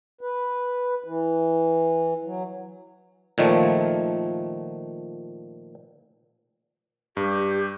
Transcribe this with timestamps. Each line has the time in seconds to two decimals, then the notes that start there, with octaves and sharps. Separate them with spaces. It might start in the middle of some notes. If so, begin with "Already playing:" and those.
0.21 B4
1.04 E3
2.25 F#3
3.38 A#2 D#3 F3 A3
7.17 G2 G4